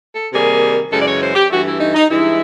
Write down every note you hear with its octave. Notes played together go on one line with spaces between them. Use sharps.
A4
C3 D#3 G3 A#3 G#4
F#2 C#3 E3 G#3 A4
D5
C#5
C5
G4
G2 E3 A3 F#4
E4
D#4
D#4
G2 E3 G#3 E4